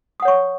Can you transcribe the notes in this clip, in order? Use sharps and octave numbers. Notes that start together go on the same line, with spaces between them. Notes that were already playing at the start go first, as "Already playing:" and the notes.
C#5 F#5 C#6 D#6